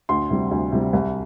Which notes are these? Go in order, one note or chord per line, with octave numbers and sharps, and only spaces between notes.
D2 C6
C3 G3
D2
C3 G3
C2